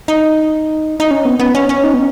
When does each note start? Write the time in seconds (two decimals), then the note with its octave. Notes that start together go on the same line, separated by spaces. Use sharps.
0.08 D#4
1.00 D#4
1.11 C#4
1.25 B3
1.40 B3
1.55 C#4
1.69 C#4
1.84 D#4
1.94 B3